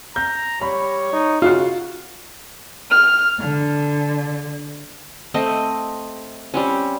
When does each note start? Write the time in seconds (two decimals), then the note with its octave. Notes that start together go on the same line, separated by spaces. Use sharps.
0.16 A#5 G6
0.61 G3 C#5 B5
1.13 D#4
1.42 C#3 F4 F#4
2.89 F6
3.39 D3
5.34 A3 C4 D#5
6.54 G3 C4 C#4